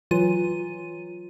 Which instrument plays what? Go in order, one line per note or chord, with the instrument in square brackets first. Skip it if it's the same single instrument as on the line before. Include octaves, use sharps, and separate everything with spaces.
[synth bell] E3 F#3 F4 D#7